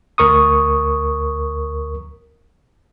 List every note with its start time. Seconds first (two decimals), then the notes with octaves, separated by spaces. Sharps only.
0.18 D2 A#4 C#6 D#6